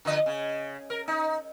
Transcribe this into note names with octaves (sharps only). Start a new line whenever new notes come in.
D3 F3 D#5
C#3
A#4
D#4